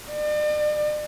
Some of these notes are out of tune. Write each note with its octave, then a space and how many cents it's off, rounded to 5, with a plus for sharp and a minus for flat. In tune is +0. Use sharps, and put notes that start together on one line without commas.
D5 +40